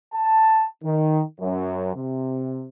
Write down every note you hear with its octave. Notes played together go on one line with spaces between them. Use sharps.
A5
D#3
F#2
C3